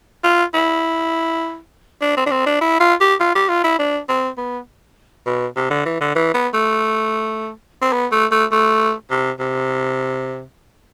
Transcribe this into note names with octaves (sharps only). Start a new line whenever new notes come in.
F4
E4
D4
C4
D4
C4
D4
E4
F4
G4
F4
G4
F4
E4
D4
C4
B3
B2
C3
D3
E3
D3
E3
B3
A3
C4
B3
A3
A3
A3
C3
C3